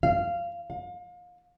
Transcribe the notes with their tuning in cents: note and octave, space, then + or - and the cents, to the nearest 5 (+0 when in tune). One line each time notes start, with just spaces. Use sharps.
F5 -15
F5 +35